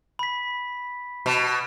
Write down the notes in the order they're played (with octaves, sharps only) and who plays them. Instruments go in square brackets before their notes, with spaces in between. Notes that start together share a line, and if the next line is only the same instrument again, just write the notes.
[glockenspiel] B5 B6
[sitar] B2